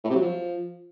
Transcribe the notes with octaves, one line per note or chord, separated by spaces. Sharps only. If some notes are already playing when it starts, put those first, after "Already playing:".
A2
C3
F#3
F3